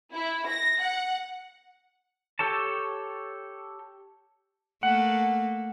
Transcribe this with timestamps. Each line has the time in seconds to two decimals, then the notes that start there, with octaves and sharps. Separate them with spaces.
0.13 E4
0.48 A#6
0.82 F#5
2.39 G4 A4 C#5 A5
4.83 A3 A#3 F#5